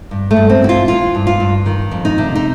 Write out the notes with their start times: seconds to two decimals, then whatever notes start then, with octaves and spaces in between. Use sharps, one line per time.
0.11 G2
0.31 A3
0.36 G2
0.50 C4
0.62 E3 F#4
0.69 F4
0.88 E3 F4
1.15 G2
1.27 F4
1.40 G2
1.66 D#3
1.91 F2
2.05 D#4
2.18 C3
2.35 D#4